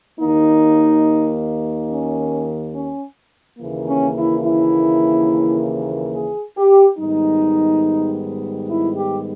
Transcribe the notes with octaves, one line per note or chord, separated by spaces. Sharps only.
D#2 D#3 A#3 D#4
C#4
C#4
D#2 C#3 E3 A#3
C#4
E4
E4
G#4
G4
G#2 D#3 G3 B3 D#4
E4
G4